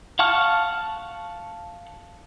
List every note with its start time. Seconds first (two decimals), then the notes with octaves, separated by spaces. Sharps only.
0.19 F5 F#5 A5 C#6 F6